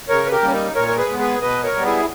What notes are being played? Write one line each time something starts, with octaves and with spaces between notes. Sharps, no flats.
C#3 A#4 C#5
B4
G4 A#4
G3 A#3 C#4
D#4
A#2 A#4 C#5
A#4
G#4 B4
G#3 B3
G#4 B4
B2 B4 D#5
A#4 C#5
G3 B3
E4 G#4